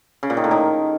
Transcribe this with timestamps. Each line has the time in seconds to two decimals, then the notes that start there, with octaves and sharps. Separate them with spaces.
0.23 C#3
0.30 A#2
0.37 D#3
0.44 A2
0.51 D#3